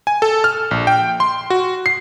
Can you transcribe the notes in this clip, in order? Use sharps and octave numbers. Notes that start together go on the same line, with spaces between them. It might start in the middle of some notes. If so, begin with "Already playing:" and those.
G#5
A4
F6
A#1
G5
C6
F#4
C7